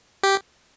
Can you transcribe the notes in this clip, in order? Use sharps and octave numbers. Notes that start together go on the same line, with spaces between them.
G4